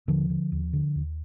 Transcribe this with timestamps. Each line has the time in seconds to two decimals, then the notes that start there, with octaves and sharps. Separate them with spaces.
0.08 D#2 D3 F3
0.30 D3
0.52 D#2
0.73 D3
0.96 D#2